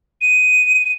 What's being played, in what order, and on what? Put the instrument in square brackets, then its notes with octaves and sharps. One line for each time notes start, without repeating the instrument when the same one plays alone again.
[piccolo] D#7